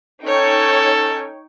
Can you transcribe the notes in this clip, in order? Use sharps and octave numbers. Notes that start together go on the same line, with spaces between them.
C#4 D#4 A4 C#5 G5